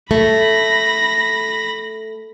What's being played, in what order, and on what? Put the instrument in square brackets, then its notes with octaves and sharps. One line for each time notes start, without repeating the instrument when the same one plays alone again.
[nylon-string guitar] A3 [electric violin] B5 A#6